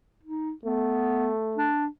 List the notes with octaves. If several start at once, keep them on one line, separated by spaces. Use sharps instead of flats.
D#4
A3 B3
D4